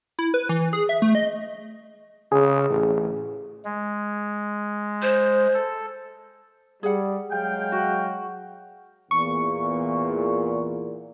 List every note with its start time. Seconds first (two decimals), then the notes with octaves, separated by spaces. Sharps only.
0.19 E4
0.34 B4
0.49 E3
0.73 G#4
0.89 E5
1.02 A3
1.15 D#5
2.32 C#3 G#4
2.70 A1
3.65 G#3
5.02 C5
5.55 A4
6.83 G3 G#4 F#5
7.31 F#3 G#3 F5 G5
7.72 F#4
9.11 E2 A#2 C#6